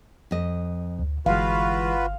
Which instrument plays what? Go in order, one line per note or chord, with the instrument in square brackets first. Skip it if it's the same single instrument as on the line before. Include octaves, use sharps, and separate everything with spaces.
[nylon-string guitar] F2 D#5
[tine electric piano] D2
[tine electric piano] G1 [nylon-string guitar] E3 G#3 [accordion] F4 F#4 B4 [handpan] F5